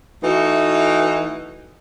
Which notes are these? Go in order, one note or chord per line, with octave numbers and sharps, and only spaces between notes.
E3 A3 D#4 F#4